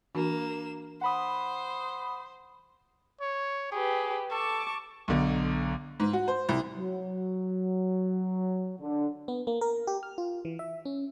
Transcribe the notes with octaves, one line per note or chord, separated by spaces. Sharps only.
E3 A#3 D4 F#4 E7
C5 F#5 B5 D#6
C#5
G4 G#4 B4
A4 A5 C#6 D6
B1 D3
G#2
F#4
C5
C2
F#3
D3
B3
A#3
A#4
G4
F6
F4
E3
E5
C#4